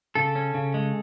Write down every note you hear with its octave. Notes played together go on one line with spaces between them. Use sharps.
C#3 A4
C#4
C#3
G#3